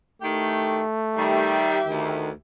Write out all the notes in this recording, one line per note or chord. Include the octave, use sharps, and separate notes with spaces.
A2 D#3 A3 G4
D#3 G3 G4 E5
D2 D#3